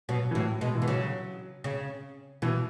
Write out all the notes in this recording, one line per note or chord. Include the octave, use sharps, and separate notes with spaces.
B2 F#3
E3
A2 F#3
B2 G#3
E3
B2
C#3 F#3
C#3
B2 E3